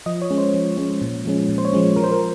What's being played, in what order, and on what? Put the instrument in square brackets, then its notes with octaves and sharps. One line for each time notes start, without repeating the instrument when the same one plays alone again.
[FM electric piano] F3 D#5
C#5
G#3 C#4
C5
F3
G#3 C#4
A#2
F3 G#3 C#4
A#2
C5
C#5
F3 G#3 C#4
F3 A#4
C5
A#4